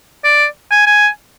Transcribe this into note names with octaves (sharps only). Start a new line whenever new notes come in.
D5
G#5
G#5